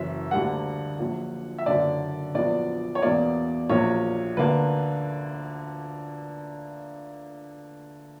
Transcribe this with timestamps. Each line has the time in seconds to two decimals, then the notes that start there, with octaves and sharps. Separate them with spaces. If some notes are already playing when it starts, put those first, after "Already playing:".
Already playing: F#1 F#2 E3 E5
0.31 D2 D3 G3 A#3 F#5
0.99 A#1 A#2 F#3
1.58 E5
1.66 F#1 F#2 D3 A#3 D5
2.34 A#1 A#2 F#3 B3 D5
2.95 C#5
3.02 E2 B2 A#3 D5
3.70 A#1 A#2 F#3 A#3 C#5
4.37 D2 D3 A#3 B4